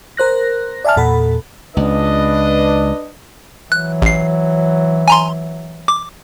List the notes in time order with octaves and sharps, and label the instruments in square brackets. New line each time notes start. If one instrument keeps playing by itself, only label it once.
[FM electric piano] A#4 C5 F#6 A#6
D5 E5 G#5 A5 F6
E2 A#2 A4 F#5 B5
[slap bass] C#2 [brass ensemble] D4 B4 D#5
[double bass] E3 F#3 [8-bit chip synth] F#6
[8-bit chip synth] A1 C7
G#5 A#5 C6
D6